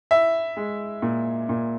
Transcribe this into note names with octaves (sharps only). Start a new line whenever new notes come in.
E4 E5
G#3
A#2
A#2